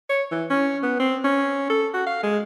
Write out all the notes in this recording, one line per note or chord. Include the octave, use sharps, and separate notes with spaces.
C#5
E3
C#4
B3
C4
C#4
A4
F#4
F5
G#3